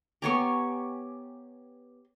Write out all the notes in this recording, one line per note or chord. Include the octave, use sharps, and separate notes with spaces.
B3 G4 C#5 G#5 A#5 C#6